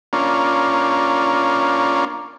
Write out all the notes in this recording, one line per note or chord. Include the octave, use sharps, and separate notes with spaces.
A#3 C#4 D4 F4